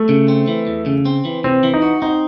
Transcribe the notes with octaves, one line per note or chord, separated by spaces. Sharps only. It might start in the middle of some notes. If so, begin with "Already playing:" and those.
Already playing: A3
C#3
C4
E3
E2
C#3
C4
E3
C3 C4
E3
D#4
F#4
C4 D#4